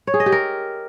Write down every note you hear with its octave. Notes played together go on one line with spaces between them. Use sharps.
C#5
G#4
D#5
G4
A#4